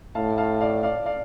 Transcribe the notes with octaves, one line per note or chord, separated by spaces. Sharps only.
A2 F5 A5
F5 A5
D5 F5
D5 F5
D5 F5